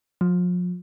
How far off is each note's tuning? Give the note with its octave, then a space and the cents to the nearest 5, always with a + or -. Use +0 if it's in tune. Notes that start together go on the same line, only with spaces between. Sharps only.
F3 +40